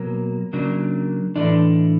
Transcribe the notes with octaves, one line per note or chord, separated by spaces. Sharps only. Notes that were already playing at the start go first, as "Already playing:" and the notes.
Already playing: B2 F#3 A#3
C#3 F#3 A#3 D4
A2 E3 A3 D4 D5